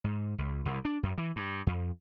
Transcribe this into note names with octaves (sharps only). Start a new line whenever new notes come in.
G#2
C#2
C2
D4
F#2
E3
G2
F2